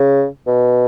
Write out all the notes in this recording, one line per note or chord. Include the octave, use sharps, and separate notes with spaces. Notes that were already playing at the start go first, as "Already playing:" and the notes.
Already playing: C#3
B2